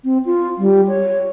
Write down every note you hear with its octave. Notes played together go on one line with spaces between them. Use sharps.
C4
F4
G3
C#5